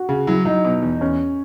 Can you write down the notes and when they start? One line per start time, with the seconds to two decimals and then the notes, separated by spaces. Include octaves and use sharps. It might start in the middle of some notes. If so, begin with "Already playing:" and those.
Already playing: F#4
0.09 C#3
0.27 F#3 E4
0.45 F#3 D#4
0.64 B2
0.82 E2
1.01 E2 C#4